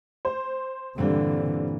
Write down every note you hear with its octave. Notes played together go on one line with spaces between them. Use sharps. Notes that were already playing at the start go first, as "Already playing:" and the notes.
C5
G2 A#2 D3 E3 G3 C4